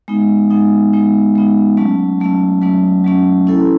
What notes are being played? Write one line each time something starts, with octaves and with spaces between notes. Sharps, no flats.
G#3 B3 D#4
G#3 B3 D#4
G#3 B3 D#4
G#3 B3 D#4
F#3 A3 C#4
F#3 A3 C#4
F#3 A3 C#4
F#3 A3 C#4
C#4 E4 A4